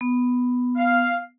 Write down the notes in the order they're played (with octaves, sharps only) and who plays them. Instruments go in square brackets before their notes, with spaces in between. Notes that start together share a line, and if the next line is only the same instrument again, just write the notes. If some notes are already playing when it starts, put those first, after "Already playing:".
[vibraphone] B3
[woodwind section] F5